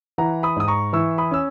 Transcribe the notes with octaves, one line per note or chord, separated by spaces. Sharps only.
E3 F#5 A#5
B5 D#6
G#2 D#6
A#5 C#6
E3 C#6 E6
B5 D#6
C#4 E6